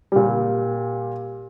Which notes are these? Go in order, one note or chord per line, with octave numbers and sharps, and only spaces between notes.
A#2 G3